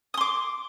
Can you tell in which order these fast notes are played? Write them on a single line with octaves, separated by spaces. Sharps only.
D#6 C6 D6